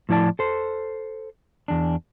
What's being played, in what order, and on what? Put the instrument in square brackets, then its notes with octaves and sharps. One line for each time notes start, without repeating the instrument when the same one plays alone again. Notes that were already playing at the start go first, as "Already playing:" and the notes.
[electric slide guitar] A2 F3 E4 D5 A5
A4 C5
E2 D4